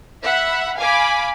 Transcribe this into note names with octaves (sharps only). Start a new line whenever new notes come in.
E5 F#5 B5
F5 G#5 B5 D6